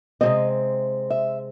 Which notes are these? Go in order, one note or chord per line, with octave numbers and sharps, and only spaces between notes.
C3 F3 G#3 C4 D#5
E5